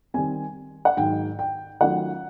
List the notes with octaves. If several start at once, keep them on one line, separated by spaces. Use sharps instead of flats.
D#3 G3 C4 G#5
F#5
G#2 D#3 F#3 G5
G5
D#3 F#3 A3 C#4 F4 F#5